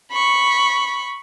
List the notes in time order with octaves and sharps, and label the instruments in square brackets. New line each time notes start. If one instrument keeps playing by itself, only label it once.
[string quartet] B5 C#6